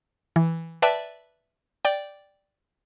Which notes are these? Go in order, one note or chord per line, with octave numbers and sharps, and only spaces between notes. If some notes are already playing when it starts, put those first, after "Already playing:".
E3
B4 D5 E5 G5 A5
D5 G5